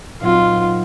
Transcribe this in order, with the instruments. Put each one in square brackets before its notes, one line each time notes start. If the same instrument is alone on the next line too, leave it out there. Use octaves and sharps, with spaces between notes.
[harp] A#2 F#3 C4 D#4 F#4 [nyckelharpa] F4